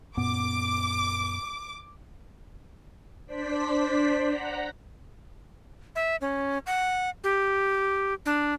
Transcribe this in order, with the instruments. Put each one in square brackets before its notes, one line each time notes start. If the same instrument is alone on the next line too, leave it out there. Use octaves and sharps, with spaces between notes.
[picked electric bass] F#2 A#2 B3 [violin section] D6
[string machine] D4 C5 D5 B6
F#5 A#5
[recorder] E5
C#4
F#5
G4
D4